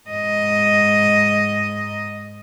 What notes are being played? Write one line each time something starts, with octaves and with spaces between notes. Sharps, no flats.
G#2 D#5